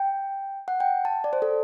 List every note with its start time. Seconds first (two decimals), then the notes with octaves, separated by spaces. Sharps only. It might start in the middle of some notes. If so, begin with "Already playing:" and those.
Already playing: G5
0.68 F#5
0.80 G5
1.05 A5
1.24 D5
1.33 C5
1.42 A4